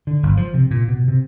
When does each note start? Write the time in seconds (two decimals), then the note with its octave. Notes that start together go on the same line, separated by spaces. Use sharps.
0.07 D3
0.23 G1
0.37 F3
0.54 C3
0.71 A#2
0.88 B2
1.08 C3